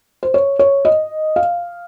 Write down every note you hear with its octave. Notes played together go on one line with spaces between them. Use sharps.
C5
C#5
C#5
D#5
F5